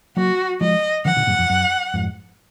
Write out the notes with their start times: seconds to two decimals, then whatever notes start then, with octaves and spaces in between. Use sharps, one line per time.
0.17 F#3 A#3 F#4
0.61 F3 G#3 D#5
1.05 D3 F3 F#5
1.16 A#2 D3
1.27 F#2 A#2
1.39 F2
1.50 F#2
1.94 F2 G#2